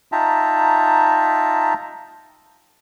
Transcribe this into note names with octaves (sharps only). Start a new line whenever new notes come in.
D#4 F4 E5 G5 A5 A#5